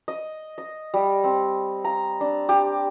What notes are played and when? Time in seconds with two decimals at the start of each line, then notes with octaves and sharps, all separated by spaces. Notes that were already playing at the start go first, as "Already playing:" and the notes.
0.08 D#5
0.58 D#5
0.94 G3
1.24 C4
1.85 A#5
2.21 D4
2.49 G4